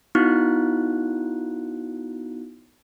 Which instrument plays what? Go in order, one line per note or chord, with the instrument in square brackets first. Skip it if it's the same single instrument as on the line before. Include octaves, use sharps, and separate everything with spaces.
[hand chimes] B3 D#4 E4 F#4 F#6